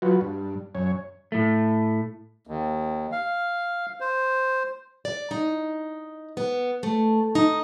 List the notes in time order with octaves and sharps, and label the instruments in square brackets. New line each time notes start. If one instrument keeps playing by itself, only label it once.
[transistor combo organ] F#3 F4 F#4 B4
G2
F#2 C#5
[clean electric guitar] A2 A3
[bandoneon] D#2
F5
C5
[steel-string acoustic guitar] D5
D#4
B3
A3
D#4